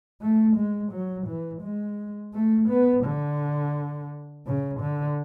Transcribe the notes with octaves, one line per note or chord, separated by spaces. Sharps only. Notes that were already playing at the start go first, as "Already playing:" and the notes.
A3
G#3
F#3
E3
G#3
A3
B3
D3
C#3
D3